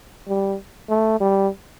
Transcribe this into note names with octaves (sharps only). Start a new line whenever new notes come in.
G3
A3
G3